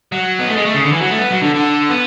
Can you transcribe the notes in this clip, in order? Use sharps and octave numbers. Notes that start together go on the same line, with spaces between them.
F#3
B3
A3
G#3
A3
C#3
D3
E3
F#3
A3
B3
F#3
D3
D3
B3